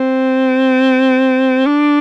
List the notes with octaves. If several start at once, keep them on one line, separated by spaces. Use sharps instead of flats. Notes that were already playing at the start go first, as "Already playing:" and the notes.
Already playing: C4
D4